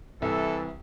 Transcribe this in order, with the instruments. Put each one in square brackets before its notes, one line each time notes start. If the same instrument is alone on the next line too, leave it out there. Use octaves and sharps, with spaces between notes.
[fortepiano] C2 [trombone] E3 [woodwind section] A4